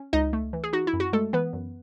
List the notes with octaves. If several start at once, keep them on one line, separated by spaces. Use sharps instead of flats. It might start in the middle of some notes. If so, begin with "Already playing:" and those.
Already playing: C#4
C#2 D#4 D#5
A3
E3
G#4
D#4 F#4
E4
F#2
F#4
G#3 A3 A4
E3 B3 B4
F#2